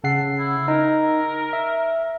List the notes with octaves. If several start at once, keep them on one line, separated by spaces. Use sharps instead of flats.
C#3 A4 F#5 C7
E4
D#4 A#4
E5